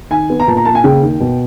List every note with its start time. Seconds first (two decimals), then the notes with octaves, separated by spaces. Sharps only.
0.11 D#3 G#5
0.30 B3
0.40 A#5
0.48 A#2 A5
0.57 A#5
0.65 A#3 A5
0.75 G#5
0.84 C#3 G5
1.02 D#2
1.20 B2